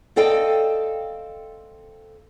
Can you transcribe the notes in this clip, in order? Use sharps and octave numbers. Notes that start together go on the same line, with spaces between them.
C4 A4 D5 D#5 F5 G5